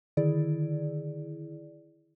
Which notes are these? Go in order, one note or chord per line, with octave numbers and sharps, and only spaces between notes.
D3 D#3 E4 G#4 D5